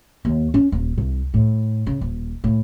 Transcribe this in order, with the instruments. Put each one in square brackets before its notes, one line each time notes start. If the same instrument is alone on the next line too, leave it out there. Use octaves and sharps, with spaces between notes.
[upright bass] D#2
C#4
D#1
C2
A2
C#3
D#1
A2